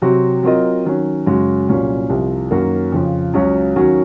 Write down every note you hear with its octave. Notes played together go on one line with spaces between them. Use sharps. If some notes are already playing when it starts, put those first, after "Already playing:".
C3 F#3 C4 F#4
F#3 C4 F4 A#4 D#5
D#3 F#3 C#4
F#2 C#3 G#3 C#4 F#4
C2 A#2 F#3 C#4
C2 C3 F3
F#2 D#3 A#3 C#4 F#4
F2 C#3 F3
C#2 C#3 F#3 C#4 F#4
D#2 D#3 F#3 C#4 F#4